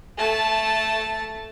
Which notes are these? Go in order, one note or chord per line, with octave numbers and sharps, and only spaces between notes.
A3 A5